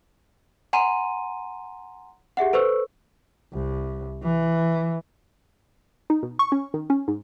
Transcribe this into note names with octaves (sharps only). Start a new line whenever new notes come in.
F#5 G#5 A#5 C6 D#7
G4 G#4 E5 F#5
A4 B4 C5 C#6 E6
C2
E3
D#4
B2
C#6
C#4
D#3
C#4
G#2